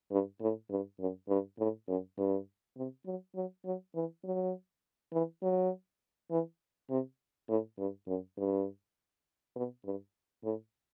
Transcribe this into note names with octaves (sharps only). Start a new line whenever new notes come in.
G2
A2
G2
F#2
G2
A2
F#2
G2
C3
F#3
F#3
F#3
E3
F#3
E3
F#3
E3
C3
A2
G2
F#2
G2
B2
G2
A2